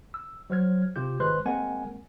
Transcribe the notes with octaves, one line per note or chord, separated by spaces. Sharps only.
E6
F#3 C5 F6 G#6
C3 F4 G4 G6
G#1 G#3 B4 C5 C6 F#6
G#3 A#3 C4 A#4 F#5 G#5